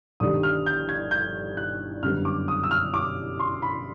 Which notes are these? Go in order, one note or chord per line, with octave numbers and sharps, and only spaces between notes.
G1 G2 D#3 G3 D#6
F6
G6
G#6
G6
F#6
F#2 D3 G3 B3 F6
D6
D#6
E6
F6
D6
C6
B5